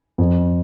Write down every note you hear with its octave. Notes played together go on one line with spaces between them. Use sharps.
F2